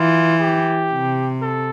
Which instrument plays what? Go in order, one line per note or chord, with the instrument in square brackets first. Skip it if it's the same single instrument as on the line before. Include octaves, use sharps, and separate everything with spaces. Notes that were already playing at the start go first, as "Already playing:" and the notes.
Already playing: [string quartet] E3 [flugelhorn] F4
[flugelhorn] G4
[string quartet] C3
[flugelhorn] A4